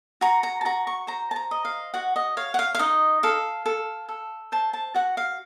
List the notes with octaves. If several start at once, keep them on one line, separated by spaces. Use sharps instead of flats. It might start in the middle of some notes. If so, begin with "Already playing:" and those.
F#4 A#5
A#5
A5
F#4 A#5
C#6
C5 A#5
A5
A#5
D#5
F5
F#4 F#5
D#5
C#5 F5
F#5
F5
F5
D#4 D#5
A4 F5
A4
A4
C5 A5
A5
F#4 F#5
F5